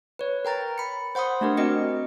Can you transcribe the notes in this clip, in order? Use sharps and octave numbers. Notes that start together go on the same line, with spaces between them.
B4 C#5
A#4 G5 A#5 A6
B5 C#7
C5 F#5 B5 C6 D#6
A3 D4 G4 A#4
C4 F#4 A#4 D#5 C#7